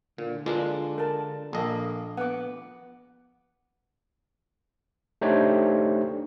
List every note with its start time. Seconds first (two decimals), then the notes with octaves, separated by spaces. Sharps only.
0.18 A#2 D3
0.46 G#3 A#3 D4 F4 B4 D6
0.98 A#4 A5
1.53 A#1 A#3 A4 D#5
2.17 B3 F#5 D6
5.22 A3 D4 D#4 G4 C5 C#5